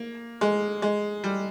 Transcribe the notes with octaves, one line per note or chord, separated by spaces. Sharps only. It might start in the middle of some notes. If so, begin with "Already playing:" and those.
Already playing: A#3
G#3
G#3
G3